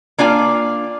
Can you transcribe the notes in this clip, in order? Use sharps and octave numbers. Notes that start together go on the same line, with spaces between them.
A#3 D4 F4 G#5